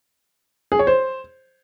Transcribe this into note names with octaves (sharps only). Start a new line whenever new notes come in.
G#4
C#5
C5